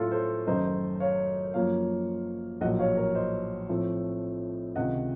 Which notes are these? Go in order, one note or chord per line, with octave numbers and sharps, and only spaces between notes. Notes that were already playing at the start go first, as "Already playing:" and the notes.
Already playing: A2 F#3 A3 C#4 F4 F#4 A4
A4 C5
F#1 F#2 D#3 A3 D#4 C5 D#5
C#5 F5
F#2 F3 A#3 F4 C#5 F5
A#1 A2 F#3 A#3 D#5 F#5
C#5 F5
A#4 C#5
C5 D#5
A2 F3 A3 C4
C#2 C3 D#3 D#5 F#5